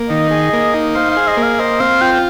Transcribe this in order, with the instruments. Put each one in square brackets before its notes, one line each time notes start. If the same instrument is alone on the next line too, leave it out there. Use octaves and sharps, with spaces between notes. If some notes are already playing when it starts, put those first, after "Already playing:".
Already playing: [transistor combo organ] A#3
[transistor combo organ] D#3 [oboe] D#5
[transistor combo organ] G#4
A#3
D#4
[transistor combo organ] C5 [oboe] F5
[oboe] F5
[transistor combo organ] G#4
[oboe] D#5
[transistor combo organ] A#3
[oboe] F5
[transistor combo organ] C5 [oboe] D#5
[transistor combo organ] C4 [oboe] F5
[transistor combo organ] F4 [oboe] G5